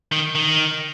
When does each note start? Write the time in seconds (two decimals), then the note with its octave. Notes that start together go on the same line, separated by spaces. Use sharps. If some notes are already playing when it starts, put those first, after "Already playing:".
0.12 D#3
0.35 D#3